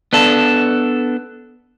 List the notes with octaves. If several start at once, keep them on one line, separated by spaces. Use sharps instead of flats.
B3 D4 A4